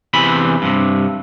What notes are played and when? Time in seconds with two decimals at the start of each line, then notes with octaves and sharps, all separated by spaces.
0.14 E2 C3 E3 B5
0.62 G2 C3